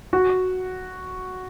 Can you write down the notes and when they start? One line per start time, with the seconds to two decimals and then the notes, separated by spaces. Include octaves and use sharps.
0.13 F#4